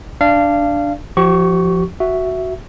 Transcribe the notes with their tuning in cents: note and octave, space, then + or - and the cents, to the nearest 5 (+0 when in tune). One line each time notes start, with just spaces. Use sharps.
D4 +0 D5 +0 F5 -20
F3 +0 G4 -40 C#6 +0
F#4 +5 E5 +0